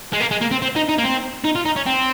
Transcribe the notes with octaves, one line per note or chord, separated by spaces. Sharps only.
G#3
A#3
G#3
A#3
C4
C4
D#4
D#4
A#3
C4
D#4
F4
D#4
C#4
C4